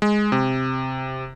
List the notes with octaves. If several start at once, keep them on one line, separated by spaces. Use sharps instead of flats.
G#3
C3